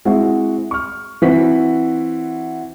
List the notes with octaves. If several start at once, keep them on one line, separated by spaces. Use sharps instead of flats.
G#3 C4 E4 F#4
C#6 F6
E3 C4 F#4 F#5 B6